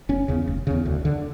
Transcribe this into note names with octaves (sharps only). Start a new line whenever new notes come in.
F1 C#4
E2 C#3
F1
E2 C#3
D2
D3